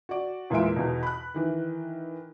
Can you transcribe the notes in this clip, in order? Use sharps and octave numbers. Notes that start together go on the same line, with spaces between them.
F#4 D5
E2 A#2 E3 G#3 E5 D7
E2 B2
B5 F#6
D#3 E3